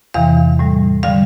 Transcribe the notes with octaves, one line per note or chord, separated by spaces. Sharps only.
E2 C3 E3 F5
A2 G3
D3 G3 F5